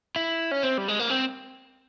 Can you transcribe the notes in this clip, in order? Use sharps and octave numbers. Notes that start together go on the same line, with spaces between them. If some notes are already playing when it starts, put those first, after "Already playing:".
E4
C#4
C4
G3
G#3
A#3
C4